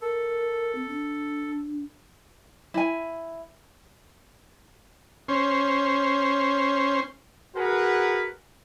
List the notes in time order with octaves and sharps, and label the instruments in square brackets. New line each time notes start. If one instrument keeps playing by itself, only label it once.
[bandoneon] A4 [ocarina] A#4
[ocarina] C4
D4
[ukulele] E4 G#5
[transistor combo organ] C#4 C5
[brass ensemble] F#4 G#4 A#4 B4 F#5